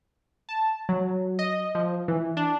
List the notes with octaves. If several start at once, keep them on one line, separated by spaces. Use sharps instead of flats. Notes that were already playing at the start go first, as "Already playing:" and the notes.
A5
F#3
D#5
F3
E3
D4